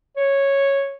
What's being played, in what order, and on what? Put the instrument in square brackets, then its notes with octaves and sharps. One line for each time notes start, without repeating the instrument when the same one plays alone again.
[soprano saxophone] C#5